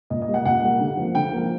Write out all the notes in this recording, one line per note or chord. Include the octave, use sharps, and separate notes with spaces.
A#2 D#5
D#5
G3 A#3
F#5
A#2 F#5
G3 A#3
D3
F3 A#3
D3 G5
F3 A#3